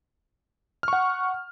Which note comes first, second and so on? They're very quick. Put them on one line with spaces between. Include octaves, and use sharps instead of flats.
F6 C#6 F#5